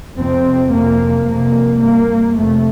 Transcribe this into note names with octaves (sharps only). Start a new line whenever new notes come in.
F2 C3 C4
F2 C3 A#3
F2 C3 A#3
G2 A#3
F2 C3 A3